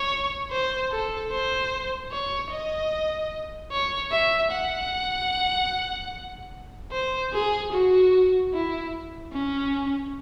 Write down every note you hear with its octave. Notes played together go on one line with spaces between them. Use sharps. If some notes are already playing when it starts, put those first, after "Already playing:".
Already playing: C#5
C5
A4
C5
C#5
D#5
C#5
E5
F#5
C5
G#4
F#4
E4
C#4